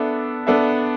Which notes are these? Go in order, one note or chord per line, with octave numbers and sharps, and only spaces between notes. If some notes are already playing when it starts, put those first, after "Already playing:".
Already playing: B3 D4 A4 E5
B3 D4 A4 E5